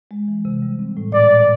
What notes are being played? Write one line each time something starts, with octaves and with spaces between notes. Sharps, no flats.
G#3
E3
C3
G3
C4
A2
A#2 D5
A#2